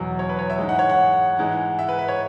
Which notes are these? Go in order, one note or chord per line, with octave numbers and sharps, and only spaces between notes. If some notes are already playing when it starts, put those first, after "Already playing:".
Already playing: E2 B2 F#3
C#5
B4
C#5
E5
G#2 E3 G#3
F#5
C#5
F#5
G#2 E3 G#3
E5
B4
B4
C#5